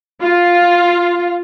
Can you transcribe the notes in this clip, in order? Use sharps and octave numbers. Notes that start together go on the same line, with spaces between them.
F4